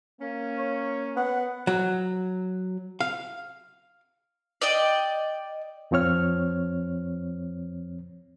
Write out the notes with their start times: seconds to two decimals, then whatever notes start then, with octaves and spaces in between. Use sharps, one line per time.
0.20 A#3 C#4
0.58 C#5
1.17 B3 F#5
1.67 F#3
3.01 F5
4.61 D5 D#5 G5
5.91 F2 F3 C4 C#5 F6